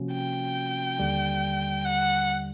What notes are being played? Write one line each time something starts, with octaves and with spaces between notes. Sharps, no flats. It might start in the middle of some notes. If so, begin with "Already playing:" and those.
Already playing: C3 F3 A#3 C#4 F#4
G5
D#2 D3 G3
F#5